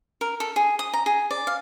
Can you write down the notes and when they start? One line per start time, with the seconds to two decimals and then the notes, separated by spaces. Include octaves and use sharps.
0.21 A#4
0.40 A4
0.56 G#4
0.79 D#6
0.93 A#5
1.06 G#4
1.31 D5
1.47 F5